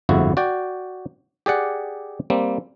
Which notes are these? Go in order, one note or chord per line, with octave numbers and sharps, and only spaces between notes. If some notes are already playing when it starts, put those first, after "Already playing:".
G1 F2 G#2 E4 F#4
F#4 D5 G5
G4 G#4 D5 F#5
G3 A#3 C4